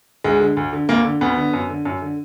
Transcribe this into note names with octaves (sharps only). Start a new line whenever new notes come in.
D2 G#3
D3
D2
D3
D2 A#3
D3
D2 B3
D3
F#2
D3
F#2
D3